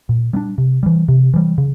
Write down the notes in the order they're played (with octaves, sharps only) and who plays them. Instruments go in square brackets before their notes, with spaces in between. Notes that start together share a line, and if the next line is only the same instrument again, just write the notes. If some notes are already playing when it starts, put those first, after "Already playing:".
[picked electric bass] A#2
G3 B3 D4
C3
E3 G3
C3
E3 G3
C#3